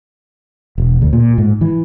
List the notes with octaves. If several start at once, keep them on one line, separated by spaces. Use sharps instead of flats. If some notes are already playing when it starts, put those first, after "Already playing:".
E1
D2
A#2
G#2
E3